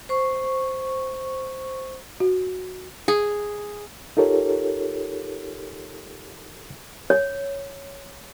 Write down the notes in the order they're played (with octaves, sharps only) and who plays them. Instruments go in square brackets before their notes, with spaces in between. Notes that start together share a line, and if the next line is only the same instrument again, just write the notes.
[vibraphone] C5 C#6
[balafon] F#4
[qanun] G#4
[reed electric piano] D#4 F4 G4 A4 A#4 C#5
[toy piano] C#5